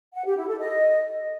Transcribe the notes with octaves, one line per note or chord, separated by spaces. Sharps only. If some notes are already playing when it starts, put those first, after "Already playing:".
F#5
G4
E4
A4
D#5